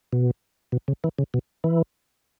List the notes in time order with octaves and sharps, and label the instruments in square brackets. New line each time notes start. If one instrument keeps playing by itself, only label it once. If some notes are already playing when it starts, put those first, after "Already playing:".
[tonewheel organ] B2
B2
C#3
E3
C#3
B2
E3